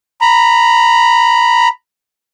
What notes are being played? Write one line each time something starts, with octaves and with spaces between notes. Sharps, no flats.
A#5 B5